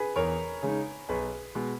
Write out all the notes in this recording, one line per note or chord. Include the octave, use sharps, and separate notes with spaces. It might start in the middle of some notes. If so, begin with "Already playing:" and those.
Already playing: G#4 B4
E2 A#4 C#5
C#3 G#3 D#4
B1 G#4 B4
B2 G#3